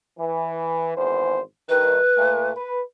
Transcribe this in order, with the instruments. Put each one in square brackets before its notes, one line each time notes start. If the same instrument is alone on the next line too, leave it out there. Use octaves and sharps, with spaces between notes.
[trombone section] E3
G#1 E2 C5
[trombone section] G2 D#3 [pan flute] B4
[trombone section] A#2 A3
B4